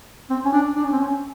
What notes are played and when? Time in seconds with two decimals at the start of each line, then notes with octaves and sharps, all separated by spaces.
0.30 C4
0.45 C#4
0.53 D4
0.76 D4
0.84 C#4
0.92 C4
1.00 C#4